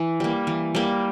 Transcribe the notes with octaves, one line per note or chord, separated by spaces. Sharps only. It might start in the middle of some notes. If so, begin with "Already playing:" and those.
Already playing: E3
G3 A#3
E3
G3 A#3